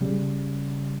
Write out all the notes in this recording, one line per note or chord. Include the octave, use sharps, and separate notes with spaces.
C#3 G3